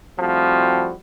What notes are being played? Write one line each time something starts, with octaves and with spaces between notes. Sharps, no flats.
F3 G3 A3 C4 E4 F#4